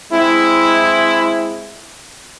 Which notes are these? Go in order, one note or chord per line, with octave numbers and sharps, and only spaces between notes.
G#3 C4 E4